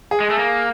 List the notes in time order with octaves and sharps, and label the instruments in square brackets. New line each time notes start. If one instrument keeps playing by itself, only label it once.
[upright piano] G#4
[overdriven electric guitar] G#3
A3
A#3